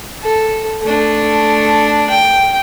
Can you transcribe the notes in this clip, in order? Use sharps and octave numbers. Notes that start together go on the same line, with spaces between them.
A4
A3 D4
G5